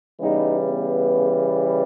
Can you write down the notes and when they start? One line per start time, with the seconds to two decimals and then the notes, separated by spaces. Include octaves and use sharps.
0.20 C#3 E3 G3 B3 D#4
0.69 B3